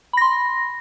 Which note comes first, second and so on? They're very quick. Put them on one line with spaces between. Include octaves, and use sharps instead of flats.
B5 A#6 C6